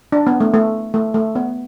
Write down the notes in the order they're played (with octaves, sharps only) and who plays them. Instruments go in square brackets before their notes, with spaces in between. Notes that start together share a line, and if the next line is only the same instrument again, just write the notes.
[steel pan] D4
B3
A3
A3
A3
A3
B3